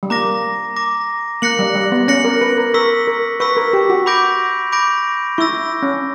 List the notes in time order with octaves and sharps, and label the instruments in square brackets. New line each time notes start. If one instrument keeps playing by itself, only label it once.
[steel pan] G3
[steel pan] A#3 [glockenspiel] A#5 D6 A#6
[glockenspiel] A#5 D6 A#6
[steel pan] A#3 [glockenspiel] F#6 A#6 C#7 F#7
[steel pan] G3
G3
B3
[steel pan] C#4 [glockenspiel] F#6 A#6 C#7 F#7
[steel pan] A#4
B4
A#4
[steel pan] A#4 [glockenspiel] C#6 E6 B6
[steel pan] A#4
[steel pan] B4 [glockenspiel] C#6 E6 B6
[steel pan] A#4
G4
F#4
[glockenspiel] B5 D6 G6 A#6 D7
B5 D6 G6 A#6 D7
[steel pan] E4 [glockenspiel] C#6 E6 A#6
[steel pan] C#4